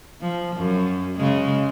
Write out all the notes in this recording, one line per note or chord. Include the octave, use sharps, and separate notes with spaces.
F3
F#2
C#3 G#3